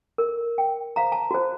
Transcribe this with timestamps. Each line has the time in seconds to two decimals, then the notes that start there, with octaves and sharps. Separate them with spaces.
0.18 A#4
0.58 G5
0.96 C5 F5 A#5
1.12 A5
1.31 F#4 C5